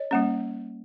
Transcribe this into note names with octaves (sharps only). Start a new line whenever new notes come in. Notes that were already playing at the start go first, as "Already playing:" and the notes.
Already playing: C#5 D#5
G3 A#3 C#4